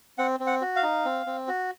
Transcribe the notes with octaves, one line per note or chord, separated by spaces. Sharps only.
C4 F#5
C4
F#5
F#4
F5
D#4
C4
C4
F#4